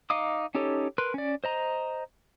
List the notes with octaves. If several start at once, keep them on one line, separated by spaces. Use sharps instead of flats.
D#4 D#5 F5 D6 D#6
C#4 D#4 G4 A4 C#5
A#4 B4 C6 F#6
C#4 D5
C5 D#5 A#5